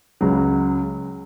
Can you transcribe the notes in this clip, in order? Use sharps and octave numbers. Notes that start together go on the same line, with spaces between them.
C#2 C#3 F#3